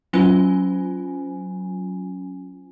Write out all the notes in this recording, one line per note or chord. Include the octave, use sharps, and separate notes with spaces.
F#3 C#4 F4 G#5